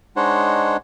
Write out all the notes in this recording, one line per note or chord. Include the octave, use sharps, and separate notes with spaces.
G#3 D4 D#4 C5 C#5 F#5